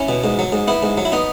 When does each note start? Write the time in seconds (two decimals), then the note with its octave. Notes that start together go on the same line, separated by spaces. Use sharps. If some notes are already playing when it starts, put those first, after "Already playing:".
Already playing: C#4 E4
0.09 B2
0.24 G#2
0.39 F#3
0.52 G#2
0.67 B3 E4
0.83 G#2
0.97 F#3
1.05 E4
1.12 B3 D#4